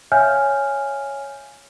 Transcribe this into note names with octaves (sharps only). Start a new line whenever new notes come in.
C#5 E5 F5 G#5 F6 G6